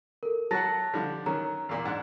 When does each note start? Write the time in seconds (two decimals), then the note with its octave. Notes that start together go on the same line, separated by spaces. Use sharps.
0.23 A4 A#4
0.51 F#3 F#4 F#5 A5 A6 A#6
0.94 D3 F3 G3
1.26 D#3 F#3 C#4 A#5
1.69 E2 A#2
1.85 G#2 D4 F#5